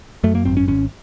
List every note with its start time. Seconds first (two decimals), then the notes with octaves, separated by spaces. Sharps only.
0.24 F#2 A3
0.35 A#3
0.45 G#1 C4
0.57 C#4
0.68 G#1 C#4